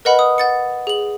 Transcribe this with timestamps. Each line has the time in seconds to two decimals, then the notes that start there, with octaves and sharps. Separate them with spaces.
0.05 A#4 B4 D#5 F#5 B5
0.19 D#6
0.38 F#5 A6 C#7
0.87 G#4 F#7